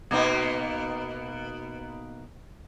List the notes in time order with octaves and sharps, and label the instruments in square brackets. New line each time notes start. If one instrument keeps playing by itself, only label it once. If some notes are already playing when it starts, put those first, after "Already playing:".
[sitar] B2 A#3 D#4